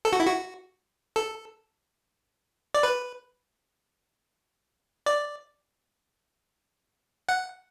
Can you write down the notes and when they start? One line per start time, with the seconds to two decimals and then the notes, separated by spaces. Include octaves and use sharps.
0.05 A4
0.13 F#4
0.20 E4
0.27 F#4
1.16 A4
2.75 D5
2.83 B4
5.06 D5
7.29 F#5